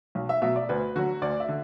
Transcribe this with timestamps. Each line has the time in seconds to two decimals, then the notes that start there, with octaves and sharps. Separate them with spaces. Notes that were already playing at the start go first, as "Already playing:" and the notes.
0.15 B1
0.29 E5
0.42 B2 F#3 E5
0.56 D5
0.69 D2 B4
0.95 D3 F#3 F#4
1.22 D2 D5
1.40 E5
1.49 D3